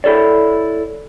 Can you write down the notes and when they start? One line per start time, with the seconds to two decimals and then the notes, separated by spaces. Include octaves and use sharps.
0.04 E4 A4 C#5 D5